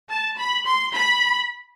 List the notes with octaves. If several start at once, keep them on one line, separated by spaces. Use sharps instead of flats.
A5
B5
C6
B5